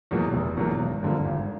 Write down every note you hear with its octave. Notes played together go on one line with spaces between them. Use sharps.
E2 B2 F#3 A#3
F1
E2 B2 F#3 A#3
G#1
G2 D3 F3 A#3
G#1